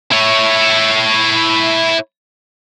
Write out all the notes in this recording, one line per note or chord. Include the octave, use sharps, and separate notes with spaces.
E4 C#5